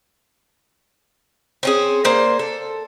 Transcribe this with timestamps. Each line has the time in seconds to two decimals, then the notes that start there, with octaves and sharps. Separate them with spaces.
1.63 C4 C#4 G#4
2.04 A#3 C5 D5
2.39 A4